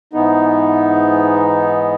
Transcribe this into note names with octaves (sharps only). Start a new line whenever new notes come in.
G#2 E3 B3 D#4